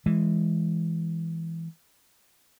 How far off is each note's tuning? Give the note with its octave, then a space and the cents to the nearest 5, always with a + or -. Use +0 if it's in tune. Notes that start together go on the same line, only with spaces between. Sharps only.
E3 +0 G#3 +0